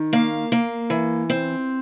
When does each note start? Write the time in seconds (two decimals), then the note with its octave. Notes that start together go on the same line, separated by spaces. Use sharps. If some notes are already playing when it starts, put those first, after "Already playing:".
Already playing: D#3
0.13 A#3 F5
0.52 A#3
0.90 E3
1.30 C4